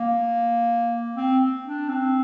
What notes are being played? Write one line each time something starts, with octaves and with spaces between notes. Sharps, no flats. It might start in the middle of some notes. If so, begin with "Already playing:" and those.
Already playing: A#3
C4
D4
C4